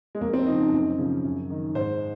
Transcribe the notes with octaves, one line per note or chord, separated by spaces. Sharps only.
G#3
F2 A#3
C4
C#3 F3 D#4
F#2
C#3 F3
F#2
D#3
G#2 C5